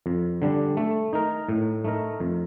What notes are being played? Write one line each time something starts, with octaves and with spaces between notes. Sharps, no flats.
F2
D3 G3 D4
A3
D#4 A#4
A2
A3 D#4 A#4
F2